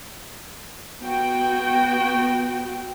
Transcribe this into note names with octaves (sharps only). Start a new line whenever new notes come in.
B3 F#4 G5